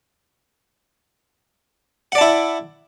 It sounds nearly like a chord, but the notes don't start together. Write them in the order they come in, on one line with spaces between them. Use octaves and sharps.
F#5 D5 A5 E4